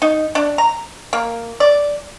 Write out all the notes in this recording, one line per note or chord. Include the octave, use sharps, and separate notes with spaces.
D#4
D4
A#5
A#3
D5